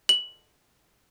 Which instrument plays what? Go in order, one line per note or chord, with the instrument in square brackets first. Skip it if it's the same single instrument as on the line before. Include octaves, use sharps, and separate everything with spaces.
[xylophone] F#7